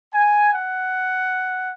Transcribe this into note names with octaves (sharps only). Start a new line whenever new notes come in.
G#5
F#5